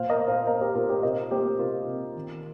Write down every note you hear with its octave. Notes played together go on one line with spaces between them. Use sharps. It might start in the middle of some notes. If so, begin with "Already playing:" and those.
Already playing: A#2 A#3 C5 F5
A#4 D#5
A#2
C5 F5
A#3 A#4 D#5
G4 C5
A#2 F4 A#4
G4 C5
C3 A#4 D#5
A#3 G4 C5
C3 F4 A#4
C3
D#3